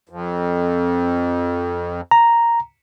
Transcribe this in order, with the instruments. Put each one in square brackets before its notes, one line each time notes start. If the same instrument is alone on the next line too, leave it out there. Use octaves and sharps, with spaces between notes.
[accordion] F2
[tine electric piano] A#5